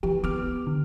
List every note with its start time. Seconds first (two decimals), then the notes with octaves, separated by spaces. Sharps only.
0.03 E3 G4
0.24 B3 D6 F6
0.67 D3